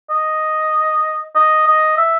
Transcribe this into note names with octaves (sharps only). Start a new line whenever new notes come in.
D#5
D#5
D#5
E5